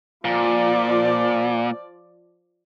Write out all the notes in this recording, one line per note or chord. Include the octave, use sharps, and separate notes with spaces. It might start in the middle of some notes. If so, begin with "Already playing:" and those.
A#2 F3 D5